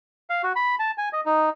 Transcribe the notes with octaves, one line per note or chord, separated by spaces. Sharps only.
F5
F#4
B5
A5
G#5
D#5
D#4